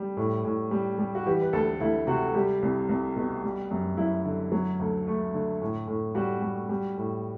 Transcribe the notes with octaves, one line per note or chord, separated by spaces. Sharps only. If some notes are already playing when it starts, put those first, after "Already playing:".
Already playing: G3
A2
A2
G3
G3
F#4
E3 G4
B4
D2 A4
D2 E4
C3 F#4
G3 G4
C2
C2
B2
G3
F#2
F#2 E4
D3
F#3
D2
A3
D3
A2
A2
G3 F#4
G3
G3
A2